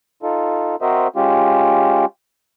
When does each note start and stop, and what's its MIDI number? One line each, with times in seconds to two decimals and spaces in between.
0.23 0.76 63
0.23 0.76 65
0.23 0.76 69
0.82 1.08 60
0.82 1.08 66
0.82 1.08 70
0.82 1.08 72
0.82 1.08 75
0.82 1.08 76
1.16 2.05 56
1.16 2.05 61
1.16 2.05 65
1.16 2.05 67